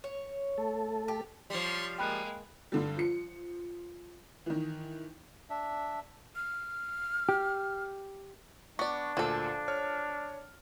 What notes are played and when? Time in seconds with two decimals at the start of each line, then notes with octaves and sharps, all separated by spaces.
0.04 C#5
0.58 A3 A4
1.08 G4
1.50 F3 G3 C#5 C6
1.98 G#3 A#3 G5 B5 F#6
2.72 G2 D3 G3
2.97 F3 C#7
4.46 D#3 E3
5.50 D4 E5
6.36 F6
7.29 G4
8.79 B3 D4 D5 C#6
9.17 D2 A#2 F3 A4
9.68 C#5 F6